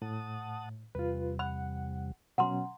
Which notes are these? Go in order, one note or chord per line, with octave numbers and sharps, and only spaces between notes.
A2 F#5 A5 D#6
E2 C3 G3 F4 B4
F#5 B5
B2 F#3 C#4 F#5 A#5 C6